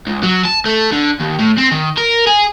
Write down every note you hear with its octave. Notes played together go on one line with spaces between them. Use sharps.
C#2
F#3
A5
A3
D3
D#2
A2
C4
D#3
A#4
G#4